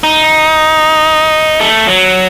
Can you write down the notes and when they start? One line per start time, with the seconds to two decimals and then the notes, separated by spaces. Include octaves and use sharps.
0.03 D#4
1.61 A3
1.87 F#3